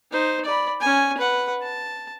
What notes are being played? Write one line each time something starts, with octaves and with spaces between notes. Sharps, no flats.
D#4 C5
D5 B5
C#4 G#5
B4 F#5
A5